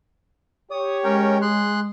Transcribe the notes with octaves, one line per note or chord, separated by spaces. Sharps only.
G4 C#5 D#6
G#3 C#4 A#4 G5
G#4 C6 F#6